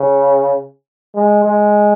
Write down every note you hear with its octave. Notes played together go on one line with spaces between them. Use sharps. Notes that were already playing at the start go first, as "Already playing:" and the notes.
Already playing: C#3
G#3
G#3